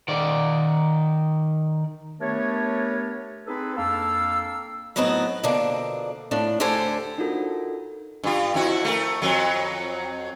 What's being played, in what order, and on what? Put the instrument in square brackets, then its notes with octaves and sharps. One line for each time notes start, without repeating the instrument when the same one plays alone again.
[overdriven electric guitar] D#3 D5
[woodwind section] A3 B3 D4 G4 A#4 C#5
C4 D#4 G#4 A4 B4
F2 A#3 D4 A4 F5 E6
[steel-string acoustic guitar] A2 F#3 B3 C4 D#4 B4
B2 D3 F3 A#3 D4
A2 F3 D4
D2 D3 G4 A4 C5 G#5
[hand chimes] D4 D#4 F4 F#4 A4 A#4
[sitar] G2 F4
F2 E4 F#4
A3 A#4
F2 F#3